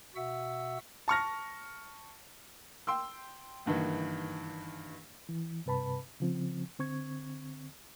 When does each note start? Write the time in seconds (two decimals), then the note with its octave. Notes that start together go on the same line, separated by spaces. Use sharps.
0.16 B2 F#4 E5 F#5 E6
1.08 A5 C#6 F6 A#6
2.87 G5 C6 E6
3.66 F#1 G2 D#3 E3
5.29 E3
5.66 G2 C3 B4 A5 B5
6.20 C#3 F3 C4
6.79 D3 C4 C#6 G#6